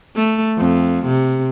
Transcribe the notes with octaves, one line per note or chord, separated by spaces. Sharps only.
A3
F2
C3